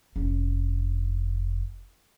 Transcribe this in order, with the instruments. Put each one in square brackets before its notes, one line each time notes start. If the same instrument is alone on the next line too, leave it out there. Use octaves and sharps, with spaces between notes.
[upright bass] F1 C#4